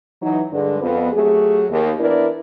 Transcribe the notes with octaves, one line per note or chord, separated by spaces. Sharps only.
E3 F#3 D#4
G2 D3 G#3
F2 B3
F#3 A3 G4 G#4
D#2
E3 B3 D4 E4 A#4 D5